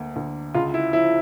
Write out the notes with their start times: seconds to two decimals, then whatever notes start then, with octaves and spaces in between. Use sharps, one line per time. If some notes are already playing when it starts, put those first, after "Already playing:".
Already playing: D2 A#3
0.16 D2
0.54 C#2 F4
0.74 E4
0.93 F3 E4